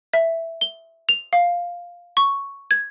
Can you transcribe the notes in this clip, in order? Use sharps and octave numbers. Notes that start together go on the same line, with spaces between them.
E5
G7
F7
F5
C#6
G#6